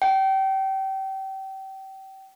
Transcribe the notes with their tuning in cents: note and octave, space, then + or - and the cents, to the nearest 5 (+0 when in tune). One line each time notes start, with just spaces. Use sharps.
G5 -30